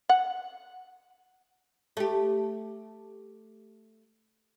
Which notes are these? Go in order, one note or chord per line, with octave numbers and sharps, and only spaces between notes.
F#5
A3 G4